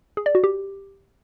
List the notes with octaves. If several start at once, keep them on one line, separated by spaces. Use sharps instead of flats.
G#4
D5
F#4
G4